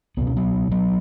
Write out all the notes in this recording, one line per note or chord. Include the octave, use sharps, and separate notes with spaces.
C#2 B2 B3
C#4
F#3 B3
F#3 B3